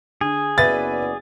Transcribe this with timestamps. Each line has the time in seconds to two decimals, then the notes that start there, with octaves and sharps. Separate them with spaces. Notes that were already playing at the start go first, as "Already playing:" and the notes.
0.21 D3 G#4
0.58 F#1 B3 B4 D5 E5 A6